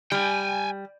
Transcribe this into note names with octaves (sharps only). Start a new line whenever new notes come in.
G3 G5 G#5